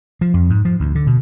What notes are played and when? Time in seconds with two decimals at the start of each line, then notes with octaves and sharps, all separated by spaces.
0.21 F3
0.34 F2
0.50 G#2
0.65 F3
0.80 D2
0.95 D3
1.07 B2